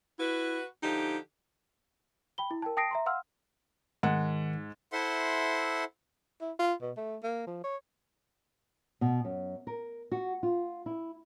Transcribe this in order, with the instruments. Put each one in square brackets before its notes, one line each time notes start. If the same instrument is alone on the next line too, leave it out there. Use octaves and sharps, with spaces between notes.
[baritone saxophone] E4 [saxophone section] F#4 B4
[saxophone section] D3 F3 G4 [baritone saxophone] D#4
[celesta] G5 B5 G7
E4
A#4 G5 A5
G5 A5 D#6 A#6 C7 D7
E5 A#5 C6
F5 F#5 C6 E6 F6
[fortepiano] G#2 [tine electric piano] D#3 [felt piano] F#5
[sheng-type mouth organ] E4 A4 C5 E5 F#5 C6
[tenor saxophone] E4
F4
B2
A3
A#3
F3
C#5
[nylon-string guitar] B2
F#2
A#4
F#4
F4
E4